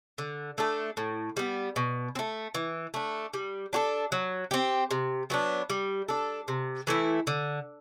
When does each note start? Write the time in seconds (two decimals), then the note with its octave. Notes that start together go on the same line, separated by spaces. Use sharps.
0.18 D3
0.58 A3 D4 A4
0.97 A2
1.37 G3 B3
1.76 B2
2.15 C4
2.19 A3
2.55 E3
2.94 A3 D4
3.34 G3
3.73 D4 F#4 A4
4.12 F#3
4.51 C4 G4
4.91 C3
5.30 F#3 B3 D4
5.70 G3
6.08 D4 A4
6.48 C3
6.87 E3 A3 E4
7.27 D3